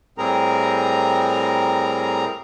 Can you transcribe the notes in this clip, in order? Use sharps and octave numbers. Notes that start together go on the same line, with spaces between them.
A2 G3 C4 G#4 A#4 A#5